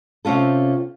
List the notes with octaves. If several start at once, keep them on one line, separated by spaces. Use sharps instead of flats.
C3 C4 C#4 F4 A4